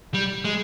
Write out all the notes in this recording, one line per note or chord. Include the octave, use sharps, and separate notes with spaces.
G3
G#3